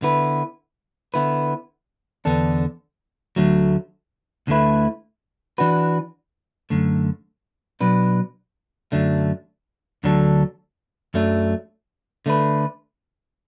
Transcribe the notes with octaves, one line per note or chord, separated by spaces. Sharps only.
D3 B3 E4 B4
D3 B3 E4 B4
E2 D3 B3 D4 A4
D2 D3 F#3 A3
D2 D3 A3 E4 B4
E3 D4 F#4 B4
F#2 D3 A3
B2 F#3 D4 B4
F#2 D3 F#3 A3 D4
D2 D3 F#3 D4 A4
F#2 F#3 A3 D4
D3 A3 D4 B4